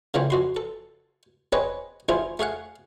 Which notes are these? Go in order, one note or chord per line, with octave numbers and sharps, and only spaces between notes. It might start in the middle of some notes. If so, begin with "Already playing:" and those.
C#3 E3 F3 A3 C4
F2 F#4 C6
A4
C4 G#4 B4 C#5 D#5
A1 E4 F4 G#4 C5
A3 G#4 F5 F#5